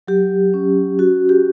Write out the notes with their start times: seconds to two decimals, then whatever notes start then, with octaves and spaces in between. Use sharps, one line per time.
0.07 F#3 G4
0.54 C#4
0.99 F#4
1.29 G4